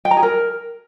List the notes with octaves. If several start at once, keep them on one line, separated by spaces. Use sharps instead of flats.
G5
A#5
G#4
A#4